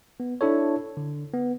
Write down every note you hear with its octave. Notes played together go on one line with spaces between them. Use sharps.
B3
D4 E4 A4 C#5
D3
B3